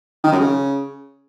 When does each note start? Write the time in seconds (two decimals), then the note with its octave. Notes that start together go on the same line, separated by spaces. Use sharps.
0.24 D#3
0.32 F#2
0.41 C#3